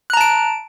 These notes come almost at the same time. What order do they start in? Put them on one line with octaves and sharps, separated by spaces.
F#6 A#5 A5 D7